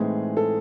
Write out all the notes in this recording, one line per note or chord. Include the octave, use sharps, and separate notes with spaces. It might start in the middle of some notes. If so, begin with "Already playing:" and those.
Already playing: A2 E3 G#3 C4 D#4 G#4
A4